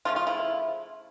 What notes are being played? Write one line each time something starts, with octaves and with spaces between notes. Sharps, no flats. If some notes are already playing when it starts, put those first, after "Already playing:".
C#3 F3 A3 F4
F4
E4